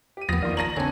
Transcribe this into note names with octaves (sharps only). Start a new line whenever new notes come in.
G4 D#7
E2 F3 B3 D#6 A#6
D#3 A#3 F4 D5 F5
C#5 A5 A#5 C6 A#6 D#7 F#7
D3 C4 D4 C#5 G#5 A5